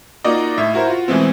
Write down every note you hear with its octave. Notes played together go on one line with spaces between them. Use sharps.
A#3 D#4 F4 F#4 D5 D#5
A2 E5
E4 F#4 A#4 C5
F4 F#4
B2 E3 G#3 A3 C4